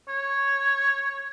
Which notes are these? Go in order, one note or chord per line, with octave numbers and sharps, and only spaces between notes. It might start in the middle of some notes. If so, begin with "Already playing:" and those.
C#5